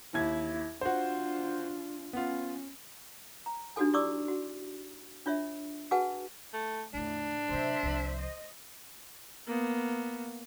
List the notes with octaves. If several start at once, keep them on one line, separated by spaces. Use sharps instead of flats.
D#2 E4 G#6
D4 F4 F#4 C5
B3 C#4 F4
A#5
D4 D#4 F#4 G4 A4 G#5
E4 G4 D5 C#6 D6 E6
F#4
D4 F4 C#5 E5
F#4 G#4 B4 F#5 G#5 A5
A3
E2 A2 D3 D4
C3 F#3 C5 E5
C2 F3
D#5
A#3 B3